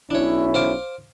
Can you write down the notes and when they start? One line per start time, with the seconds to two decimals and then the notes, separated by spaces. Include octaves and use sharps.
0.10 B1 C#4 D4 E4 C#5
0.54 C5 F5 D6